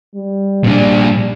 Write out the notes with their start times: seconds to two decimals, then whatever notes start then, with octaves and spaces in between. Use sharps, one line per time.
0.15 G3
0.64 A#2 D4